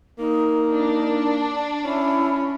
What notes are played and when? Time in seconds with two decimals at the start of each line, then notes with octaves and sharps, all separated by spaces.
0.18 A#3 D#4
0.73 D4
1.84 C#4 E4